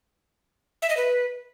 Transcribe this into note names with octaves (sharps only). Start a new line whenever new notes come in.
E5
D#5
B4